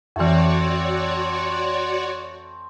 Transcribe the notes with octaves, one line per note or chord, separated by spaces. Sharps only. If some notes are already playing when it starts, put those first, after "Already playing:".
F2 E3 A3 C4 F#4 C#5 D5